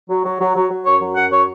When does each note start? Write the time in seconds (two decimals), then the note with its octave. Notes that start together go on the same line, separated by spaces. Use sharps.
0.10 F#3
0.25 F#3
0.41 F#3
0.56 F#3
0.71 F#3
0.86 F#2 C#5
1.01 F#3
1.16 F#2 F#5
1.32 F#3 C#5